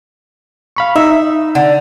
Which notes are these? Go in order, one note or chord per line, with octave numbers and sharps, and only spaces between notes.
F5 B5 C#6
D#4 E5
D3